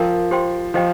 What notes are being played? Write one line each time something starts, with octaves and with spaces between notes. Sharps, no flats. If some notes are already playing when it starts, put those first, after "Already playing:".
Already playing: F3 A#4 G5 A#5
G4 C5 G5 C6
F3 G4 C5 D#5 G5